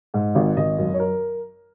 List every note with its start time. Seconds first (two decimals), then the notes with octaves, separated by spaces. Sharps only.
0.14 G#2
0.35 G#1
0.57 G#1 D#5
0.78 F#2
0.94 C#5
1.00 A#4